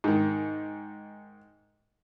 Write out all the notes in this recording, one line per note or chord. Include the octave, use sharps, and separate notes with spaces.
G#2 D#3